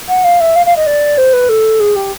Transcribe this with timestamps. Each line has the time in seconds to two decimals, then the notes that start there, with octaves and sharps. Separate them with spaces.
0.08 F#5
0.24 F5
0.40 E5
0.55 F5
0.66 F5
0.76 D#5
0.86 D5
1.17 C5
1.33 B4
1.49 A4
1.79 G#4
1.95 G4